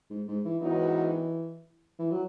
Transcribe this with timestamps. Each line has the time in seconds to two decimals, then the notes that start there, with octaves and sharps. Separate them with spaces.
0.10 G#2
0.27 G#2
0.45 E3
0.62 G#2 D#3 E3 F#3 B3 D#4
1.99 E3
2.11 F#3